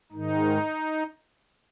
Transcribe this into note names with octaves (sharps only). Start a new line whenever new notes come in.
G#2 D#3 D#4